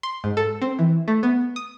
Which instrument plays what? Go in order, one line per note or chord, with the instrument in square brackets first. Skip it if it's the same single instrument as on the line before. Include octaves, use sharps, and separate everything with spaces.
[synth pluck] C6
G#2
A4
C4
E3
A3
B3
D#6